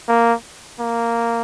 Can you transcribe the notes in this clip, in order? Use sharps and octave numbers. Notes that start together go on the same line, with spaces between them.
A#3
A#3